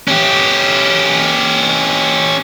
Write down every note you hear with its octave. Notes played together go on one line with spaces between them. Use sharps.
C#4 G4